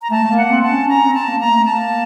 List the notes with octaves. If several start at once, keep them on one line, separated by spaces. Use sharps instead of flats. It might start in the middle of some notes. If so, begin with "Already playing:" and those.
A#5
A3 A5
A3
A#3
F#5
C4
A5
C#4
C#4 A#5
C4
A5
A#3
A#3 A#5
A3
A#3 A5